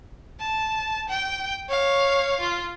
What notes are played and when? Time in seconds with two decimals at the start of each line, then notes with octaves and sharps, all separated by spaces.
0.40 A5
1.09 G5
1.69 C#5 F5
2.41 F4